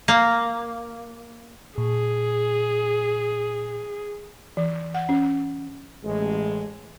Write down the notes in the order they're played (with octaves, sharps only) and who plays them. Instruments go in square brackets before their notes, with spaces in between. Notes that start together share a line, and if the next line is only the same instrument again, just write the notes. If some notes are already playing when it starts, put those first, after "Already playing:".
[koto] A#3
[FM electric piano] A#2 [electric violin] G#4
[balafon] E3
F#5
C#4
[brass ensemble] A1 G#3